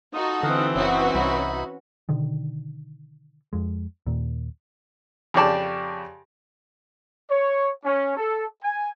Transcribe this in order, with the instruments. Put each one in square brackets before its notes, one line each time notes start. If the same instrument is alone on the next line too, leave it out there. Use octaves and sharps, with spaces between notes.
[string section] D#4 F#4 A4 [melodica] F4 D#6
[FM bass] D3 [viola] E3 C4 [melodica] D#5 F5 F#5
[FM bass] F#1 [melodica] B3 D#4 E5 [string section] C#4 F#4 B4
[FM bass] C2 [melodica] D#4 E4 B5
[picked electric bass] B2 D3 D#3
F2 G#3
D#2 A#2
[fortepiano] F2 C#3 G4 D5 A5
[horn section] C#5
C#4
A4
G#5